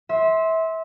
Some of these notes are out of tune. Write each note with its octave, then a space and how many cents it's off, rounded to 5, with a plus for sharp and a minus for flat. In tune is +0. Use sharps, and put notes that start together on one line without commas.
E5 -25 C6 +5